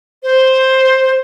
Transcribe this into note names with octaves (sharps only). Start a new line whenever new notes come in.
C5